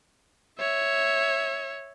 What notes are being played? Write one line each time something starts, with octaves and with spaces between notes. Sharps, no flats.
C#5 E5